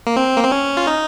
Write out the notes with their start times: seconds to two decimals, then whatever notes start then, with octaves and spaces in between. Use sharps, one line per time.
0.07 A#3
0.16 C4
0.37 A#3
0.44 C4
0.52 C#4
0.77 F4
0.87 D#4